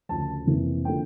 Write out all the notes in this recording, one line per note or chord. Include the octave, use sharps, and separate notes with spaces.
D2 C#3 F3 A5
F1 F2 E3 A#3
D3 F3 A#3 G5